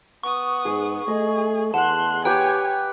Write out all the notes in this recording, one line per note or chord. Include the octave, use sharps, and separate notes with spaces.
B3 C#6 D#6
G#2 G#4
A3 G#4 D#5
E2 F#5 A5 C6 F#6
G4 B4 C#5 G5 G#5